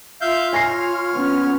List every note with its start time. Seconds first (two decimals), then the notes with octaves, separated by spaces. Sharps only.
0.21 F4 E5 F5 G6
0.53 C#5 G#5 F6 A#6 C7
1.14 B3 C#4